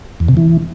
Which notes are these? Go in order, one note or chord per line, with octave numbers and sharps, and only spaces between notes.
E2
C3
E3